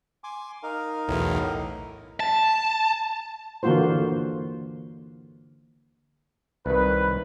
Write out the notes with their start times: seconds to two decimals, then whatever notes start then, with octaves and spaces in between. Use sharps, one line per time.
0.24 G#5 C6 D6
0.63 D#4 A#4 F5
1.08 B1 E2 A2
2.20 A5
3.63 D3 E3 A#3 F4 F#4 C5
6.66 C2 D#3 B4